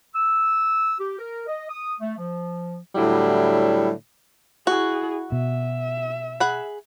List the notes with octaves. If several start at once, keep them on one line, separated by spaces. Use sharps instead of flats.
E6
G4
A#4
D#5
D#6
A3
F3
A2 D3 F#3 G3 E4
E4 F#4 G#4
B2 E5
G#4 F#5 B5